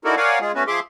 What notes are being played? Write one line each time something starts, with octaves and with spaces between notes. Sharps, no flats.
D#4 E4 F#4 A4 A#4 D5
A#4 C#5 D5 F5 F#5 G#5
G#3 F4 G#4
A3 B3 C#4 F#4 B4
F3 G#4 E5 C6 D6